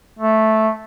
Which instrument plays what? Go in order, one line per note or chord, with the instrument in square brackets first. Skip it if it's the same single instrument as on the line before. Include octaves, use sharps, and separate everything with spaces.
[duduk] A3